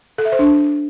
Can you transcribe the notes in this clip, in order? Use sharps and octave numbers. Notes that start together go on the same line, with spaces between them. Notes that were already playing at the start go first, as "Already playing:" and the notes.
A4
E5
C5
D4